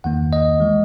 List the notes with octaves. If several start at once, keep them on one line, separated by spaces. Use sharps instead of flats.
E2 D#3 A#3 F#5
D#5
E3 G#3